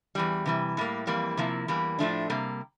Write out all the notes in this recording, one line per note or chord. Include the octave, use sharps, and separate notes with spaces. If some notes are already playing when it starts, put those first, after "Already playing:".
E2 E3 G3
C3 E3 G3
A2 G3 A#3
F2 E3 G3 A#3
C3 F3 A#3 E4
E2 E3 G3 A#3
A2 F3 A3 D4
C3 G3 A#3